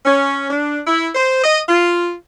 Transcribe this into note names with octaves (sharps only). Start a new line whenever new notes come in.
C#4
D4
E4
C5
D#5
F4